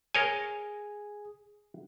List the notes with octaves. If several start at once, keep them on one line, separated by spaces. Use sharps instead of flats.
G#4 A#4 C#5 G#5